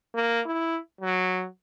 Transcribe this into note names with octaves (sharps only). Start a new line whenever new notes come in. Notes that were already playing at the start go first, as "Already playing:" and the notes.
A#3
E4
F#3